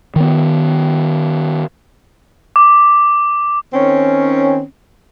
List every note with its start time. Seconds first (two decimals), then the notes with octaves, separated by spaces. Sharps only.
0.16 D#3 B3
2.56 D6
3.73 D#3 C4 C#4